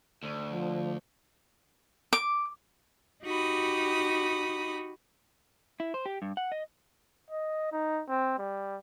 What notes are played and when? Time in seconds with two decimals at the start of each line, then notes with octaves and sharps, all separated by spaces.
0.23 D2
0.51 F3
2.13 D6
3.23 D#4 F#4 G4 B5 D#6
5.80 E4
5.94 C5
6.06 G4
6.22 G2
6.37 F#5
6.52 D#5
7.31 D#5
7.72 D#4
8.09 C4
8.39 G3